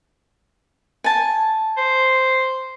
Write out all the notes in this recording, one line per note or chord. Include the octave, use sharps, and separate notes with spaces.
G#5 A5
C5